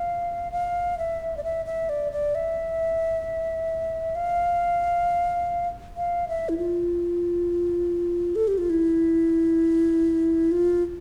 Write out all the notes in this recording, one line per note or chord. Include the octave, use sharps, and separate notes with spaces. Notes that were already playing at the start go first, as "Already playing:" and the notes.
Already playing: F5
F5
E5
D5
E5
E5
D5
D5
E5
F5
F5
E5
E4
F4
A4
G4
F4
E4
F4